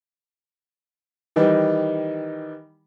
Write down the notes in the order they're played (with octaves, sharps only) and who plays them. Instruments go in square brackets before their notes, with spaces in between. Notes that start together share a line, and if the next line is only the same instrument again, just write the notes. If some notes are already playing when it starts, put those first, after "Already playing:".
[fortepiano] D#3 E3 G3 D#4